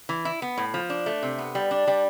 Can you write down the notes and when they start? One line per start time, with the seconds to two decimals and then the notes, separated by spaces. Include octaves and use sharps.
0.09 E3
0.25 E4
0.42 B3
0.58 A2
0.74 F3
0.90 D4
1.06 A3
1.23 C3
1.39 B3
1.55 G3
1.71 D4
1.87 G3